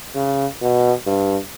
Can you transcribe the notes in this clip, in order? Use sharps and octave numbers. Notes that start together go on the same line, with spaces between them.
C#3
B2
G2